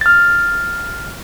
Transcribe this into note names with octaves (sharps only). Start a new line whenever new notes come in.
F6 A6